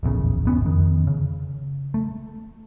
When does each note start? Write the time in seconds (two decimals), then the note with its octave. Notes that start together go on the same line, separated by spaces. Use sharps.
0.03 D1 A#1 E2 C#3
0.45 G#1 B3 C#4
0.62 F2 D#3
1.07 C#3
1.94 A3